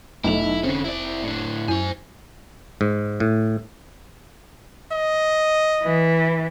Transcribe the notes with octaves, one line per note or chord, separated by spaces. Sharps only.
F1 B1 A3 E4 F7
D3 C4 C#4
E4 D5
A2 D4
F#2 E4 C5 G#5
G#2
A2
D#5
E3